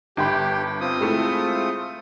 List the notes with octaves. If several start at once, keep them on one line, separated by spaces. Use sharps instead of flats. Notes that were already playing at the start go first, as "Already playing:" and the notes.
G1 G4 G5 B5
C4 F4 D#6
G#3 A3 E4